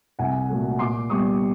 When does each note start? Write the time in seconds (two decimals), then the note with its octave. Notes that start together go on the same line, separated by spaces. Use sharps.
0.19 C2 F#5 G#5
0.50 A#2 F#3 A3
0.79 A#2 C6 D6
1.10 G3 B3 C#6 D#6